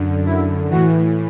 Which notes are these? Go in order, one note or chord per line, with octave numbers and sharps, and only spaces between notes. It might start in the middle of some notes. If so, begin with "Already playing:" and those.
Already playing: F#2 D3
E4
A2 E3 F#4